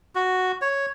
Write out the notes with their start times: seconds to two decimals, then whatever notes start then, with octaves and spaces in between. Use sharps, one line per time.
0.15 F#4
0.61 C#5